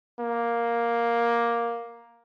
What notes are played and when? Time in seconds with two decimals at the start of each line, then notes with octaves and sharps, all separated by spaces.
0.19 A#3